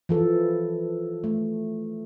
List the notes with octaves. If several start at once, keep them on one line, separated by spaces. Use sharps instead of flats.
E3 F3 A4
A3